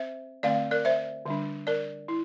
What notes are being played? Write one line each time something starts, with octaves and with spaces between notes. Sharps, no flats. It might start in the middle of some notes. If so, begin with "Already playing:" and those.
Already playing: C4 C5 E5
D3 A3 C4 D5 F5
A#4 D5
C5 E5
D3 G3 D4
A#4 D5
E4